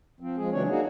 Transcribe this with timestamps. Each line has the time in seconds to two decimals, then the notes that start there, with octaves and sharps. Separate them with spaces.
0.20 F3 C4
0.37 F3 G#3 G#4
0.53 C#3 E3 F#3 D4 C#5
0.69 A#3 D#4 F#4 G#4